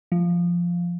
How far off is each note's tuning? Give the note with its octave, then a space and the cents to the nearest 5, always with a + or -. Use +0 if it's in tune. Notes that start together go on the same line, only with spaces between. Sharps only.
F3 -5